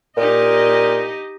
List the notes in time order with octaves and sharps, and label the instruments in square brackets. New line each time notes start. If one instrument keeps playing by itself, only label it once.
[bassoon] A#2 [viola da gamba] D#4 G4 D#5